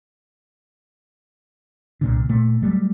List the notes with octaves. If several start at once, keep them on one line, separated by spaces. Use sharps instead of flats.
C2 A#2 D3
A#2 A3
F#3 G3 A3